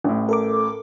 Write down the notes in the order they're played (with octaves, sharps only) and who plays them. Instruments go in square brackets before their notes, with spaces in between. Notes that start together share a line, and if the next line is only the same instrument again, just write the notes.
[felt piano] A1 A2
[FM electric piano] A4 A#4 D6